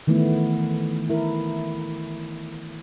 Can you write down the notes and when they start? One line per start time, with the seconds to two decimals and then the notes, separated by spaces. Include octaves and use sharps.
0.07 D#3 E3 A3 B3 E4
1.10 E4 A#4